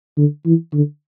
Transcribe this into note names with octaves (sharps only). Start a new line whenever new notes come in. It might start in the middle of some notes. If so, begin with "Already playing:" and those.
D3
E3
D3